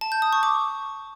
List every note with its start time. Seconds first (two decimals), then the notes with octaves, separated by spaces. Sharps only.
0.01 A5
0.12 G6
0.22 D#6
0.33 C#6
0.43 D6